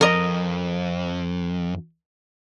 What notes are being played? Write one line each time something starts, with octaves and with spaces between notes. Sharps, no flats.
F2 A#4 D#5